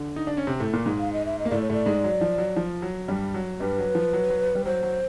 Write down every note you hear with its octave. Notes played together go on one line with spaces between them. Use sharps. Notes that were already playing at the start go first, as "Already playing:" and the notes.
Already playing: D3
D#4
D4
C#4
C3 C4
A2 A3
A#2 A#3
G#2 G#3
F5
D#5
E5
D#5
A#3
A2 A3 D5
C#5
A2 A3 D5
G#2 G#3
F#3
F3
F#3
F3
F#3
G2 G3
F#3
G2 G3 B4
F#3
F3
F#3
F#3
G3
F#3 C5
F#3